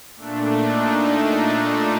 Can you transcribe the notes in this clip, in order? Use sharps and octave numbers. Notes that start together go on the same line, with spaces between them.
A#2 A3 D4
D#4